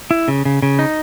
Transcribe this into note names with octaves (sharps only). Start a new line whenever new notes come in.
E4
C#3
C#3
C#3
D#4